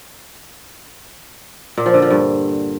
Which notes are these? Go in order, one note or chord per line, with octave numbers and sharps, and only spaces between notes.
A#2
F3
D3
F3
G2